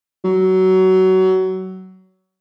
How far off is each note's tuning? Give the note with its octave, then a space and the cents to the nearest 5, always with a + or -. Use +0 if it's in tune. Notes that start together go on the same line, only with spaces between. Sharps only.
F#3 +20